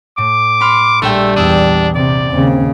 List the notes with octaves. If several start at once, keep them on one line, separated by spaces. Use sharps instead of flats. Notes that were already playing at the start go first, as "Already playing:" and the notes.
A2 D6
B5 C6 F6
A#1 G3 A3 E5 G5
E2 D4 D#6 E6
C3 D5
D#2 C#3 C4